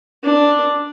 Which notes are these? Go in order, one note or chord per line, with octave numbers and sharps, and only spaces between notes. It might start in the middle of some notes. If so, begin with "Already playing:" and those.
D4